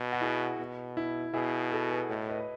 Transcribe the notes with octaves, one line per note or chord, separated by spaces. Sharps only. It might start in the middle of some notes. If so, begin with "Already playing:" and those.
Already playing: B2
F#4
E4 G#4
B2
E4
B2 E4 G#4
F#4 A4
G#4 B4
A2 D#5
B4 D#5
B4